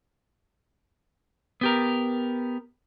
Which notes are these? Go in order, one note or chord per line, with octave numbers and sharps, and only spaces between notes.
B3 G4 A#4